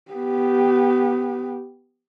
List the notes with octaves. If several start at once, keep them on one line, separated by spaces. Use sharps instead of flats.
B3 G4